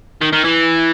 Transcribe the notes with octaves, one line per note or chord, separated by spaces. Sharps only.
D#3
D#3
E3